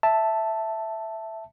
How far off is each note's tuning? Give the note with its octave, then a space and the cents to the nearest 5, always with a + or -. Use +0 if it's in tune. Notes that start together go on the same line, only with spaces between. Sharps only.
E5 +0 A5 +0